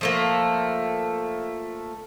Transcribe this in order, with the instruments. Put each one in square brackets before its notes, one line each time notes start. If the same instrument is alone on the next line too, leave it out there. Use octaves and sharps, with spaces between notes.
[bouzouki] F3 A3 A#3